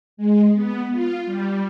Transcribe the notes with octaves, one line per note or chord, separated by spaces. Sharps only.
G#3
B3
F4
G3